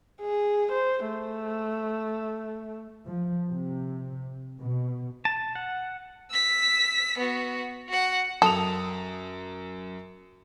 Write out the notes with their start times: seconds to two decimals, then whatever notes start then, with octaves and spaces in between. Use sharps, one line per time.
0.21 G#4
0.72 C5
1.08 A3
3.07 F3
3.51 C3
4.60 B2
5.25 A5
5.55 F#5
6.31 E6 B6
7.18 B3 F#4
7.89 F#4 F#5
8.42 F#2 A4 D#6 F7